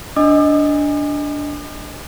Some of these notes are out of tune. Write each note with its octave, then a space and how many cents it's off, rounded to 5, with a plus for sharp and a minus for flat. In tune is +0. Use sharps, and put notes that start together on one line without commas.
D4 -10 D#5 +0 D6 +45